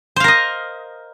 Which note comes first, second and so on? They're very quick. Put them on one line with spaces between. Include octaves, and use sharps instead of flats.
C5 F5 A#4 D#5